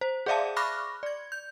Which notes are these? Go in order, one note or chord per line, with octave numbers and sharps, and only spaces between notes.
C5
G#4 C5 D5 E5 F5 A5
B5 C#6 D6 F6 F#6 A#6
D5 G#6
G6